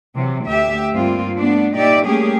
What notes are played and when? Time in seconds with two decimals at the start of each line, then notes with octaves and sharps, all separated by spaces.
0.16 C3 E3 F#3
0.46 D2 G4 E5
0.92 G2 A#3 C4 F4
1.38 A3 B3 D4
1.75 A#2 D#4 G4 D5 E5
2.05 G3 A3 A#3 C#4 G4 G#4